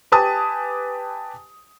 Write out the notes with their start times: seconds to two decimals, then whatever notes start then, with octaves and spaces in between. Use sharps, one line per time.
0.12 G4 B4 G#5 A5 D#6